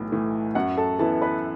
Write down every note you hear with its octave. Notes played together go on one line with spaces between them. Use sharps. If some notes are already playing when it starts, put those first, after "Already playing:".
Already playing: B1 A2 E3
A2 E3
F#2 F#4 F#5
A4 A5
E3 B3 E4 A4 A5
B4 B5